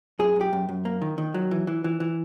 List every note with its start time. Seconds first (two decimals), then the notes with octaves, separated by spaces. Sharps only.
0.19 F#2 G#4
0.36 F#2 G4
0.53 F#2
0.69 F#2
0.85 A#3
1.02 D#3
1.18 D#3
1.34 F#3
1.51 E3
1.67 E3
1.84 E3
2.00 E3